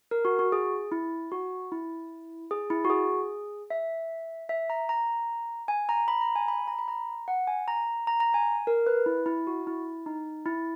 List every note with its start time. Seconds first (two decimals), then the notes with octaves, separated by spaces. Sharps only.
0.11 A#4
0.25 F#4
0.39 F#4
0.52 G#4
0.92 E4
1.32 F#4
1.72 E4
2.51 G#4
2.70 E4
2.85 F#4
2.90 G#4
3.70 E5
4.49 E5
4.70 A#5
4.89 A#5
5.68 G#5
5.89 A#5
6.08 B5
6.21 A#5
6.36 G#5
6.48 B5
6.67 A#5
6.79 B5
6.88 A#5
7.28 F#5
7.47 G#5
7.68 A#5
8.07 A#5
8.20 A#5
8.34 G#5
8.67 A#4
8.87 B4
9.06 E4
9.26 E4
9.47 F#4
9.67 E4
10.06 D#4
10.46 E4